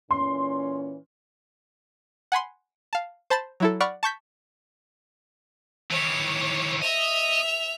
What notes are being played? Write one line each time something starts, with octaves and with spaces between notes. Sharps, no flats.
A#2 E3 C#4 C6
F#5 G#5 B5 C6
F5 A5
C5 A5 B5 A6
F#3 E4 A4
D5 F#5 B5 C#6 F6
A5 C#6 G6 B6
D#3 E3 C#5
D#5 E5 F7